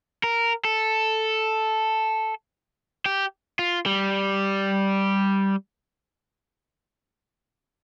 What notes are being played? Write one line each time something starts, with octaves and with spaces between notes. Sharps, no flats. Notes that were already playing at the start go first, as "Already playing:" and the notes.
A#4
A4
G4
F4
G3